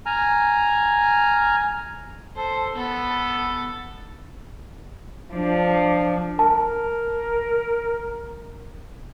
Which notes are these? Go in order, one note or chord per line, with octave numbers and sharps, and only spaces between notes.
G#5 A#5 F6
A4 C5
B3 A4
F3 D4
A#4 A5